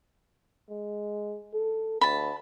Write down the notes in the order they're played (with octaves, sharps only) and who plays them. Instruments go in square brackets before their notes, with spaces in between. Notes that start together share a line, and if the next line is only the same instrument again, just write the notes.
[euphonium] G#3
A4
[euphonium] D2 [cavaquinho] A5 B5